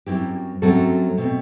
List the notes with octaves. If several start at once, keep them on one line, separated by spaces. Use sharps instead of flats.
F#2 F#3 C4 E4 G4
F#2 F#3 A3 C4 F#4 A4
B2 A3 C4